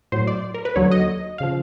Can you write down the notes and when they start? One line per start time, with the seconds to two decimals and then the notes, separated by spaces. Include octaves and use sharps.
0.12 A2 F#3 C5
0.27 D5
0.54 A#4
0.65 B4
0.76 D#2 D3 F#3 C#5
0.91 D#5
1.38 C#3 F3 F5